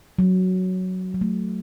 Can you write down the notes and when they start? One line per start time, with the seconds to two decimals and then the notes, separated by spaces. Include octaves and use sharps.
0.19 F#3
1.14 F#3
1.21 A3